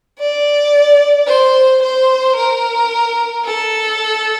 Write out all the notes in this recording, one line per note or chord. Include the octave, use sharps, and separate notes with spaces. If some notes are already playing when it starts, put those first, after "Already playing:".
D5
C5
C5
A#4
A4